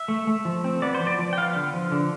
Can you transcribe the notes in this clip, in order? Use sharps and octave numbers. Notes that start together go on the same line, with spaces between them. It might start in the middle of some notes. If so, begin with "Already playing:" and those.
Already playing: E5
A3
A3
F3
C4
B3 D5
C5
F3
D5
F3
G5
B3 F5
D3
F3
D3